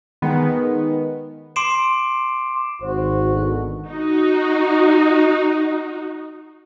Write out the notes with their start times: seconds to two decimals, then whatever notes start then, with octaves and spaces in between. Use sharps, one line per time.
0.22 D#3 G#3 B3
1.56 C6 D6 C7 D7 E7
2.82 G#1 F#4 C5
3.32 B2 D3
3.88 D#4 F#4